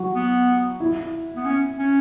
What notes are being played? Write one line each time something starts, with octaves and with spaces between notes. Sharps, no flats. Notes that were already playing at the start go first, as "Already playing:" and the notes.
Already playing: F#3 F#4
B3
E4
B3
C#4
C#4